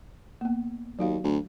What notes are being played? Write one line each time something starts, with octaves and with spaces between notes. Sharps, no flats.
A#3 B3
D#2 F#3 F#4 F5
D2